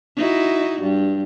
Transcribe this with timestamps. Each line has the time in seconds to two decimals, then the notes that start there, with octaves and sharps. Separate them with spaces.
0.16 D#4 E4 F#4
0.81 G2 G3